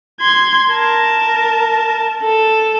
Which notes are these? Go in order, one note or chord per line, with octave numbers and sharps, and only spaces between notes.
C6 G#6
A#4 A5
A4